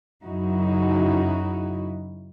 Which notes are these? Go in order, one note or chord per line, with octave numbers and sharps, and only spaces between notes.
F#2 C#3 D#4 E4 F#4